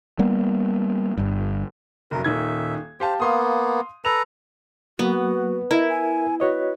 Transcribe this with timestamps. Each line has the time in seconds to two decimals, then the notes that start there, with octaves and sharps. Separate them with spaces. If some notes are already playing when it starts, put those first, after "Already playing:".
0.19 G3 A#3 B3
1.17 G1 G2
2.11 F1 F#2 A#4
2.24 D#1 D#3 E5 G#6
3.00 G4 C5 F5 A5
3.20 A#3 B3 F5 C6 D#6
4.05 A4 B4 A#5 F7
4.99 F#3 A#3 B3 F#4 B4
5.71 E4 A#4 D#5 E5
5.89 G#5
6.40 F#4 B4 C#5 D#5